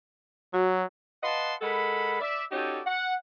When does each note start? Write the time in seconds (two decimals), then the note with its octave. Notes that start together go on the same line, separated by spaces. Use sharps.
0.54 F#3 F#4
1.23 B4 D#5 F5 F#5 A5 C6
1.61 G#3 A4 A#4 F#5 B5
2.21 D5 E5
2.52 C#4 D#4 F#4 G4 A4 D5
2.86 F#5